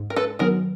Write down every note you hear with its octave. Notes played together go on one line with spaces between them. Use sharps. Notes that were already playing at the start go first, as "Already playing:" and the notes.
Already playing: G#2
A#4
A4 B4
D#3 F#3 B3 G#4 A#4